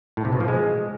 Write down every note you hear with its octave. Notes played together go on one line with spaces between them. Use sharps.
A2
C3
B2
F3
G#3